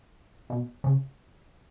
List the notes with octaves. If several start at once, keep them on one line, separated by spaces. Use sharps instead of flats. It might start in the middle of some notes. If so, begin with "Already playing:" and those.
B2
C#3